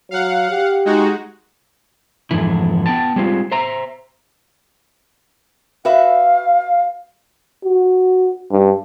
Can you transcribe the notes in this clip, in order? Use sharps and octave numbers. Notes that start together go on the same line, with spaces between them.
F#3 F5 F#5
G4
G#3 D#4 F#4
F2 G#2 D3 E3 E4
B3 G5 A5
G3 G#3 C4 E4 F4
C5 E5 A#5
F#4 B4 E5 F5
F#4
G2